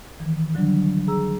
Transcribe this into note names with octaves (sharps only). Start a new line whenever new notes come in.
D#3 E3
D3 F#3 G3 D4
G#4 A#5 E6